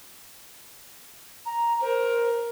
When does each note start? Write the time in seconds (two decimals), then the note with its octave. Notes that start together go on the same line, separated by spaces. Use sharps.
1.46 A#5
1.81 A#4 C5